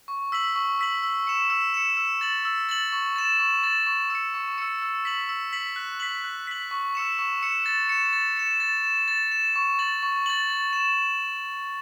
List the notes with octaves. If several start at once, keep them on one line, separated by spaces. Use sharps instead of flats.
C#6
E6 B6 F#7
C#6
E6 B6 F#7
E6
C#7 E7
E6
C#7 E7
E6
A6 F#7
E6
A6 F#7
C#6
A6 E7
C#6
A6 E7
C#6
E6 C#7
C#6
E6 C#7
E6
B6 F#7
E6
B6 F#7
F#6
B6 F#7
F#6
B6 F#7
C#6
E6 C#7 E7
C#6
E6 C#7 E7
A6
C#7 E7
A6
C#7 E7
A6
E7
A6
E7
C#6
A6 F#7
C#6
A6 F#7
A6
E7